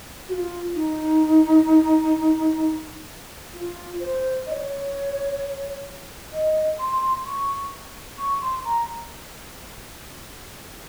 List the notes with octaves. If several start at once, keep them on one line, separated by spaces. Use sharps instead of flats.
F#4
F4
D#4
F4
C5
D#5
C#5
D#5
C6
C#6
C#6
C6
A#5